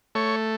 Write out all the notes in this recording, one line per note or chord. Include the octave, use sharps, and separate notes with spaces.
A3 C#5